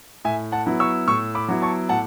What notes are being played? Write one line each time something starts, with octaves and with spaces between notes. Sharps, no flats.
A2 E5 G#5
F#5 A5
F#3 B3 E4
C#6 E6
A2 C#6 E6
B5 D6
F#3 B3 E4
A5 C#6
A2 F#5 A5